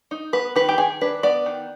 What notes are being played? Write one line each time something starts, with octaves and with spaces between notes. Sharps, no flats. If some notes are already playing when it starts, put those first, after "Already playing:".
D#4
B3 B4
D#3 B4
G4
D#3 G#4
D4 B4
B3 D5
D#3